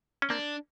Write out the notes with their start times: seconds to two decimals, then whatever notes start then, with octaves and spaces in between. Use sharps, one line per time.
0.22 C#4
0.30 A#3 C4 D4